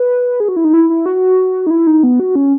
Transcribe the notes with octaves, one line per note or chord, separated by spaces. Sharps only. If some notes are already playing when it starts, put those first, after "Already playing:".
Already playing: B4
G#4
F#4
E4
D#4
E4
E4
F#4
D#4
E4
D#4
B3
F#4
C#4